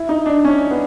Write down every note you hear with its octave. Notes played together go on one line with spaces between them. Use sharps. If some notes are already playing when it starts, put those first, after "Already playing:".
Already playing: E4
D#4
D4
C#4
B3